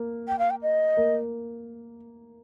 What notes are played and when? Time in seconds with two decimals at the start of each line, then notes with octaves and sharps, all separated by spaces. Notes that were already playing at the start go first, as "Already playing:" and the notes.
Already playing: A#3
0.28 G5
0.39 F5
0.50 G5
0.62 D#5
0.97 A#3